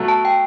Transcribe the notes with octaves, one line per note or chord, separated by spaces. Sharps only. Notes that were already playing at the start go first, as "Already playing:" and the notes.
Already playing: B2 F#3 A3
A5
G5